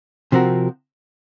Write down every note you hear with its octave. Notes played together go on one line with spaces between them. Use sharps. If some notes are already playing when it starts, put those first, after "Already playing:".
C3 F3 C4 F#4 A#4